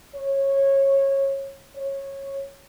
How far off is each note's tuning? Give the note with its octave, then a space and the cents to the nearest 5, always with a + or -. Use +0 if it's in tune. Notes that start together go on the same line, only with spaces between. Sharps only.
C#5 -20
C#5 -15